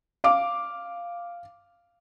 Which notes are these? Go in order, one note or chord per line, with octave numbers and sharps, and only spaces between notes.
F5 D6